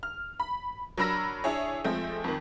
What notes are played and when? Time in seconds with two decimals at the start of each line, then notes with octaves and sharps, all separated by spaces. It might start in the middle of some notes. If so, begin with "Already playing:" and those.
0.03 F6
0.40 B5
0.97 F#3 D4 A#4 B5 E6 A#6
1.44 D4 E4 G#4 C#5
1.84 F3 G#3 A3 C4
2.24 F2 D#3